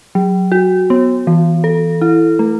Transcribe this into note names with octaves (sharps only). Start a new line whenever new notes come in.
F#3
F#4
B3
E3
A4
E4
A3